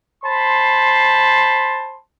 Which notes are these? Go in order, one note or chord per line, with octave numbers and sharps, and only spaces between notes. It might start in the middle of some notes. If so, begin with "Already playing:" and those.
C5 A5 B5 C6